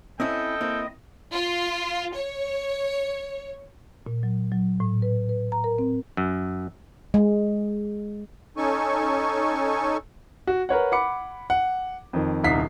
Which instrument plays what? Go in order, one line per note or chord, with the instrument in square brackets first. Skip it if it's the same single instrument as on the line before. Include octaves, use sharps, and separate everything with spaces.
[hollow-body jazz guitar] C4 C#4 E4 [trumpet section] A4 G5 [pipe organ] D#5
[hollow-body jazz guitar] A#3 C4 E4
[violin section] F4
C#5
[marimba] A#2
F#3
F#3
A2
B4
B4
A#5
A#4
C4
[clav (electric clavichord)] F#2
[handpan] G#3
[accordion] C#4 D#4 A4 G#5 C#6
[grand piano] F#4
A#4 B4 C#5 F#5
F#5 B5 D6 C#7
F#5
F2 D#3
D#1 C2 D#4 B6 C7